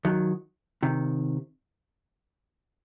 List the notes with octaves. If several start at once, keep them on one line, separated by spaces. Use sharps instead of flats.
D#3 F#3
C3 D#3